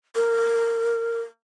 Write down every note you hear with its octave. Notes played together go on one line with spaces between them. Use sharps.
A#4